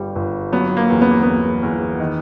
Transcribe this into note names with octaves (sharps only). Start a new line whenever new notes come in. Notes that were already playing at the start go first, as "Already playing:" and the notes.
Already playing: G1 G3
G1
F#3 B3
A#3
E2
B3
A#3
E2 B3
E2
D#3